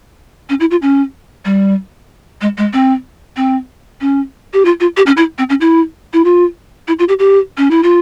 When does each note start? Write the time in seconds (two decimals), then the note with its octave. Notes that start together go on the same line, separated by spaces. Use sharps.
0.49 C#4
0.60 E4
0.71 F4
0.82 C#4
1.45 G3
2.41 G#3
2.58 G#3
2.73 C4
3.36 C4
4.01 C#4
4.53 G4
4.65 F4
4.80 F4
4.97 G4
5.06 C#4
5.17 E4
5.38 C4
5.49 C#4
5.61 E4
6.13 E4
6.24 F4
6.88 E4
6.99 F4
7.08 G4
7.19 G4
7.57 C#4
7.71 E4
7.83 F4